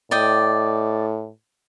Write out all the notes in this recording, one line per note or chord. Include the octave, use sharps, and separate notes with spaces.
A2 D5 D#5 G5